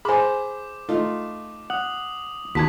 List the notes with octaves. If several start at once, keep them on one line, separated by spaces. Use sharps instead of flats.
G#4 C5 G#5 B5 D6
A3 D#4 F4
F#5 D#6 F#7
D#2 F#4 A5 G#6 B6